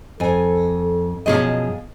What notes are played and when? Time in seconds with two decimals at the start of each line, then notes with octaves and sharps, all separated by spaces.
0.20 F2 A4 G#5
1.26 F#2 B2 F3 G#4 D#5 A5